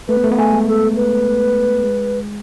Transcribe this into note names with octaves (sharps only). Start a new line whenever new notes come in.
A3 B4
B3
A3
B3
A3 G#5
G#3
A4
B4
G#3